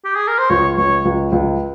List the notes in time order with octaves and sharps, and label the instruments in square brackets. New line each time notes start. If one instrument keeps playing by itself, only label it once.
[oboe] G4
G#4
A#4
C5
[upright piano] C#2 [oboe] C#5
[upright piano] C#2 [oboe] C#5
[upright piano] C#2
C#2